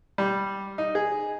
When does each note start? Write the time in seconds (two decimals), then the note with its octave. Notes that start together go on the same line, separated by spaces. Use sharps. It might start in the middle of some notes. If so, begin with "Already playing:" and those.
0.18 G3
0.78 D#4
0.95 G#4